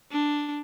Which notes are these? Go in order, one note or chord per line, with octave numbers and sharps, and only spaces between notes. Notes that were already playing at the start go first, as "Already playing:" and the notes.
D4